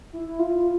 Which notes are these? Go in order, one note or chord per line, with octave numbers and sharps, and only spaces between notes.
E4
F4